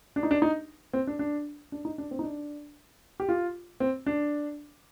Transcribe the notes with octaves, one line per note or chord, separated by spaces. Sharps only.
D4
D#4
D4
D#4
C4
D4
D4
D4
D#4
D4
C4
D#4
D4
G4
F4
C4
D4